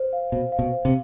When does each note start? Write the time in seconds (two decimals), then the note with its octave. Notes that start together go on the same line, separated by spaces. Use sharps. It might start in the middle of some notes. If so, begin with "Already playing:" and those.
Already playing: C5
0.13 F5
0.32 B2 C5
0.52 F5
0.59 B2
0.72 C5
0.85 C3